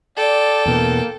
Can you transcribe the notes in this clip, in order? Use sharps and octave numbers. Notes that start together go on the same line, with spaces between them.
A4 D5 G5
E2 B2 A#3